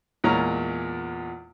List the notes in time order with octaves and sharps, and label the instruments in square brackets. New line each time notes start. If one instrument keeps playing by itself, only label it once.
[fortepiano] E2 A#2 G#3 C#5 A#5 F6